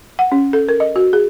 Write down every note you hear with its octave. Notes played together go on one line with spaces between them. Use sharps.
F#5
C#4
A4
A#4
D#5
F#4
G#4